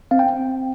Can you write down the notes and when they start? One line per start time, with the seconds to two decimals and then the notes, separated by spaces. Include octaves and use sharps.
0.11 C4 F5
0.19 G5